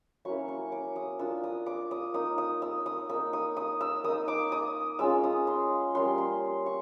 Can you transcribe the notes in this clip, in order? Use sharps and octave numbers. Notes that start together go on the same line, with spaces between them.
F#3 A#3 C#4 E4 C#6
C#6
D6
D#6
A#3 D4 F4 E6
D#6
D6
D#6
A#3 D#4 D#6
D#6
E6
D#6
A#3 D#4 E6
D#6
D#6
E6
A#3 D#4 D#6
D6
D#6
G#3 C#4 F4 E6
D#6
C6
G3 A#3 C#4 C6
C6
C#6